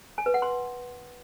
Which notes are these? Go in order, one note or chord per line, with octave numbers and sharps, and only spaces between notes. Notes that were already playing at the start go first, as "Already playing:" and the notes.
G#5
B4
F#5
C6